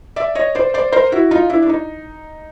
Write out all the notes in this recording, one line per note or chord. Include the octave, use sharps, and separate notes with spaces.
D5 E5
C#5 D#5
C5 D5
C5 D5
A#4 C5
E4 F#4
D#4 F4
D4 E4
D4
D#4